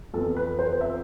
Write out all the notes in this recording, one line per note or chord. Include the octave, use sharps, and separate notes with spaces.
F2 E3 B3 A4
B4
C5
E5